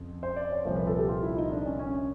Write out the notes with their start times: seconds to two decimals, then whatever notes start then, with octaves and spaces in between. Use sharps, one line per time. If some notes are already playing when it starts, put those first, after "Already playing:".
Already playing: F2 C#3
0.23 C5
0.36 D5
0.51 C#5
0.65 C2 A#2 F3 C5
0.76 B4
0.87 A4
0.98 G4
1.09 F4
1.23 E4
1.37 D#4
1.52 D4
1.66 C#4
1.79 C#4